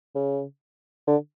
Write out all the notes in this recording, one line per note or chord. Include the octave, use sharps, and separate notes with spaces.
C#3
D3